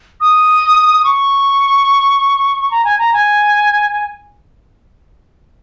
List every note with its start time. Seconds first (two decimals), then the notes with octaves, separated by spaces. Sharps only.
0.20 D#6
1.04 C#6
2.71 A#5
2.85 G#5
2.99 A#5
3.13 G#5